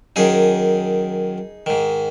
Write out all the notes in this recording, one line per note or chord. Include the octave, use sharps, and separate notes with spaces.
F#2 D#3 D#4 G#4
G#2 D#3